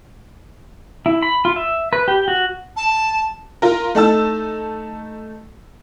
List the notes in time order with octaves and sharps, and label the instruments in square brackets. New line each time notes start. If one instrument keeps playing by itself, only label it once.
[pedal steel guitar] E4
B5
F4
E5
B4
G4
F#4
[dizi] A5
[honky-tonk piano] F4 A#4
A3 D#4 A5 E6